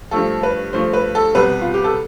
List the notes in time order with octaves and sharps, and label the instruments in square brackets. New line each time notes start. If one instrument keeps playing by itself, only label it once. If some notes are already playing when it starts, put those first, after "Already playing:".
[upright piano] G2 F3 A3 A4
B4
G2 F3 A3 C5
B4
A4
C2 B2 G3 B4
F4
G4
A4